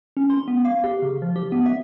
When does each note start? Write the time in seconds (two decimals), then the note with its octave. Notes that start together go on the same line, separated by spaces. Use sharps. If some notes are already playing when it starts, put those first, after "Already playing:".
0.17 C#4
0.30 C6
0.48 B3
0.65 F5
0.84 G4
1.02 C#3
1.22 F3
1.36 G4
1.52 B3
1.66 E5